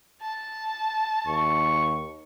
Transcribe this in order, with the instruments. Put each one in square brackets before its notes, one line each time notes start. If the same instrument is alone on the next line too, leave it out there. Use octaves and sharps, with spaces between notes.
[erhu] A5
[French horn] D#2 [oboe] C#6